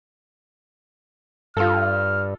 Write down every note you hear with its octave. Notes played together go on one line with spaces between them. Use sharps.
G2 F4 A4 F6